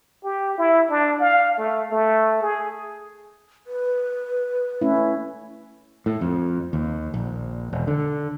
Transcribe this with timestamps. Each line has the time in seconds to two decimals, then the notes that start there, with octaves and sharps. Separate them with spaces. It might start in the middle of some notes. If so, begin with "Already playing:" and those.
0.24 G4
0.58 E4
0.90 D4
1.21 F5
1.58 A3
1.91 A3
2.42 G#4
3.67 B4
4.81 A3 C#4 E4
6.06 A2
6.21 F2
6.73 D#2
7.14 A#1
7.73 E1
7.87 D3